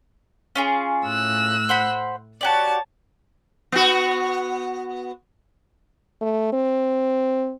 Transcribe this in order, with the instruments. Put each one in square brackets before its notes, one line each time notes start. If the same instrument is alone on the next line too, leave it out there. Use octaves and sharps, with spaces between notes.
[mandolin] C#4 F4 G#4
[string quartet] A2 E6 F#6
[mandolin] C5 F#5 B5
[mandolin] F#4 G4 D5 [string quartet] C#5 A5
[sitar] B3 F#4
[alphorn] A3
C4